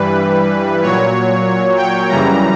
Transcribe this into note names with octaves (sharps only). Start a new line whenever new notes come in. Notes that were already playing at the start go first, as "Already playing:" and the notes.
Already playing: G2 E3 G3 B4
A#2 F#3 C#5
G5
F#2 C#3 E3 G3 A#5